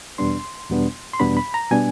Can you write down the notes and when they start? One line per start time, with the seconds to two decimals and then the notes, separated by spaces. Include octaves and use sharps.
0.18 E2 B2 G3 B3 D4 C6
0.69 E2 B2 G3 B3 D4
1.13 C6
1.20 E2 B2 G3 B3 D4 B5
1.37 B5
1.54 A#5
1.71 B2 G3 B3 D4 G#5